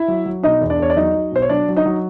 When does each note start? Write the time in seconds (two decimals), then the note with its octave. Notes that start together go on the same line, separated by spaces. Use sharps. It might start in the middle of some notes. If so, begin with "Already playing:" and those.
Already playing: E4 E5
0.08 F#3
0.26 F#3
0.43 B2 D#4 D#5
0.61 E2
0.70 D4 D5
0.79 E2 C#5
0.90 D5
0.96 F#3 D#4 D#5
1.14 F#3
1.32 B2 C5
1.42 C#5
1.49 F#3 D4 D5
1.68 F#3
1.76 D#4 D#5
1.86 F#3